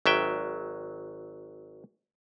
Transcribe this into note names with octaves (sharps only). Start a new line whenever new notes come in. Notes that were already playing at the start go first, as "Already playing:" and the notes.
G#1 F#3 E5 G5